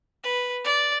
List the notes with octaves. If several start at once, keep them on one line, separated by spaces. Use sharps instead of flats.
B4
D5